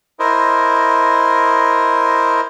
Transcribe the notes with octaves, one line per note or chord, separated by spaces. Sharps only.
E4 A#4 C5 D#5